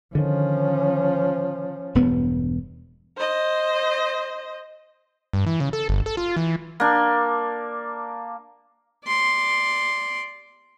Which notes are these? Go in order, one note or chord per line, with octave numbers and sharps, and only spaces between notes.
D3 D#3 F3 C#4
E1 G2 B3
C5 D#5
G2
E3
C#3
A4
G1
A4
F4
E3
A#3 D4
D5 C6